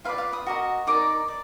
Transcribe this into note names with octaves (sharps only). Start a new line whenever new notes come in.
F4 B4 D5 F5
F5
B5 D#6
F#4 A#4 D#5
D#4 A#4 D5 A#5 D6
D5